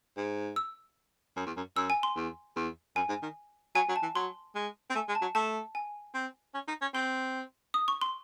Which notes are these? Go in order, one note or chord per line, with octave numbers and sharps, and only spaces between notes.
G#2
E6
F#2
E2
F#2
F#2 E6
G#5
C6
E2
E2
F#2 G#5
G#2
D#3
F#3 G#5
F#3
A5
E3
F#3 C6
G#3
C4
A3 G#5
G#3
A5
F#3
A3 A5
G#5
C4
C#4
D#4
C#4
C4 C6
D#6
C#6
C6